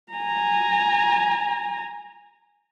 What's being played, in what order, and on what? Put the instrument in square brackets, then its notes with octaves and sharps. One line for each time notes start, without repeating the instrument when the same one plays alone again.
[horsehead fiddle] G#5 A#5